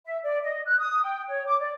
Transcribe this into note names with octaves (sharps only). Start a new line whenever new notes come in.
E5
D5
D#5
F#6
D#6
G5
C#5
D6
D5